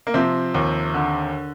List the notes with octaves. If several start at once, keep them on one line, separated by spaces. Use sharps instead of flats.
A#3
C3 F3 C4
D#2
D3